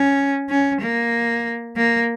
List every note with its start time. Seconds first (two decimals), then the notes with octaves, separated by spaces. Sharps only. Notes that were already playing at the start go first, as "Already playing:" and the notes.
Already playing: C#4
0.50 C#4
0.81 A#3
1.77 A#3